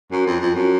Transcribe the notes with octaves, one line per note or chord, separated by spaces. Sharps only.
F#2
F2
F2
F#2